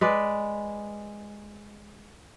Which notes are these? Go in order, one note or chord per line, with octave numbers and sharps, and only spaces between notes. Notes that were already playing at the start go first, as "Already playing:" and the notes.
G#3 B4 D5